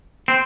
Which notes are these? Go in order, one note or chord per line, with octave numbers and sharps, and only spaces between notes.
C4